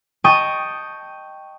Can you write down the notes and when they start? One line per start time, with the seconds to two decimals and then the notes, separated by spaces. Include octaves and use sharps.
0.24 D#5 G5 A5 C#6 D#6